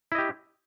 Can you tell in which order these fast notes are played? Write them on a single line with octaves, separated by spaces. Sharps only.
E4 D#5 G4